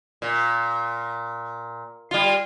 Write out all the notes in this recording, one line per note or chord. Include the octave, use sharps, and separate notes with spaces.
A#2
G3 F4